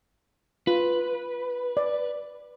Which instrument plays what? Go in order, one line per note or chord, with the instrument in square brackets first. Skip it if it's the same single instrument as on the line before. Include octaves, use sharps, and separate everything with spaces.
[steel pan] F4 [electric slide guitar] B4
[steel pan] D5